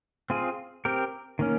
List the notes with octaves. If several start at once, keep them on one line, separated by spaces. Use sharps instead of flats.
C4 F4 G#4
C4 G4 A#4
D#3 A#3 C#4